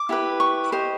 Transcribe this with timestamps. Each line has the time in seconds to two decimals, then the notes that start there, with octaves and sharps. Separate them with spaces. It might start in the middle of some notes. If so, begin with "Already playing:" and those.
Already playing: D6
0.09 E4 G4 B4
0.40 C#6
0.72 G4 C5 D#5